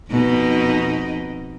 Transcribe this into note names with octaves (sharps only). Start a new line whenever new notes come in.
F2 B2 D#4